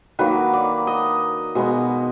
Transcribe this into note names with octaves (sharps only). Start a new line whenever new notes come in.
D#3 F#3 A#3 B4
D5
D#5
B2 G#3 B3